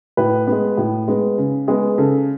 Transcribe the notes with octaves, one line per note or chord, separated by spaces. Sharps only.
A2 B4
B3
G#3
A2
G#3 B3
C#3
G#3 B3 G#4
C#3 A4